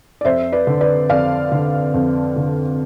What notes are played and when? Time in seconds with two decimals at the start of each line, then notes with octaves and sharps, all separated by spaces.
0.21 D5
0.25 F2 C5 E5
0.52 B4 D5
0.67 D3
0.81 B4 D5
1.09 F2 D5 F5
1.52 D3
1.94 F2
2.36 D3